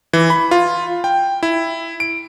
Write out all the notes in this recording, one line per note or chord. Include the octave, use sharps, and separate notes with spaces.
E3
B5
F4
G5
E4
D7